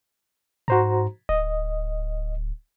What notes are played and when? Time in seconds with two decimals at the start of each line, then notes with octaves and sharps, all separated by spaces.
0.68 G#2 F#4 C5 A#5
1.29 D1 D#5